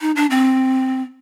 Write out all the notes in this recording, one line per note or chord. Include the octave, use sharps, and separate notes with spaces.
D#4
D4
C4